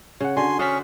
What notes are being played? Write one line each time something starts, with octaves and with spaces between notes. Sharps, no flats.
C#3 C#5 F#5
D3 D4 F#4 G#5 C6
C#4 F#4 C5 D5 C#6 D#6 F6 B6